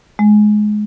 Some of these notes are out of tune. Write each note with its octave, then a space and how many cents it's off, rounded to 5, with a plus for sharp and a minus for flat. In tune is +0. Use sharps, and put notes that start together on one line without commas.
G#3 +20